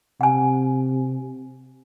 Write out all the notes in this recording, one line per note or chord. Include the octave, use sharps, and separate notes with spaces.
C3 F#5 G#5